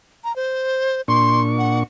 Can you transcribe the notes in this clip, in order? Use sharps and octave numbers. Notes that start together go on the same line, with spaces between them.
A#5
C5
A#2 D4 C6 C#6
F#5